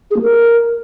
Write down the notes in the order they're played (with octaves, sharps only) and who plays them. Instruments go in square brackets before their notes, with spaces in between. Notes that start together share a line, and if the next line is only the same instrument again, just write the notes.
[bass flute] G#4
A#3
A#4